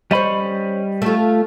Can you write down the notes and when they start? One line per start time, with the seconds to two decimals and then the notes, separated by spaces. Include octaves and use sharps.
0.11 G3 C#4 C5 D#5 B5
1.02 A3 F4